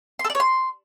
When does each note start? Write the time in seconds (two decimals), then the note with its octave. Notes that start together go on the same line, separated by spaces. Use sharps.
0.19 C6
0.25 A4
0.30 D5
0.35 C#5
0.40 C6